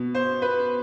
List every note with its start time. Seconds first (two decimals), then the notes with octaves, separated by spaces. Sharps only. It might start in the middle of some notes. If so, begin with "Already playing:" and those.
Already playing: B2
0.15 C5
0.42 B4